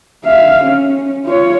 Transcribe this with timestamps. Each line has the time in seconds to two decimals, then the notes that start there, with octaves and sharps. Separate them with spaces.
0.25 E5 F5
0.64 C#4
1.26 F4 C#5